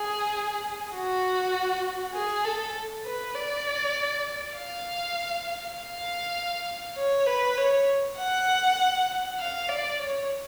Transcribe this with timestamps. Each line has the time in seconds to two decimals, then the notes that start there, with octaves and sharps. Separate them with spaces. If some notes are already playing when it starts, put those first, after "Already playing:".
Already playing: G#4
0.94 F#4
2.14 G#4
2.45 A4
3.06 B4
3.35 D5
4.55 F5
5.76 F5
6.97 C#5
7.27 B4
7.57 C#5
8.18 F#5
9.38 F5
9.69 D5
9.99 C#5